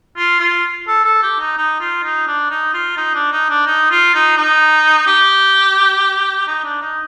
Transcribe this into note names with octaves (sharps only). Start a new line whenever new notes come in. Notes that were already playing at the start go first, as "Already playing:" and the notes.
F4
F4
A4
A4
G4
D#4
D#4
F4
D#4
D4
D#4
F4
D#4
D4
D#4
D4
D#4
F4
D#4
D#4
G4
D#4
D4
D#4